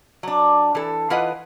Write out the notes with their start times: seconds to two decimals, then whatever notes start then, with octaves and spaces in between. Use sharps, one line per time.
0.23 F#3 D4
0.75 E3 A4
1.10 E3 F4 B4 D#5 F#5